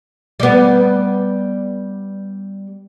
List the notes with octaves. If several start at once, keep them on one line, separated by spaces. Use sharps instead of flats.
G3 B3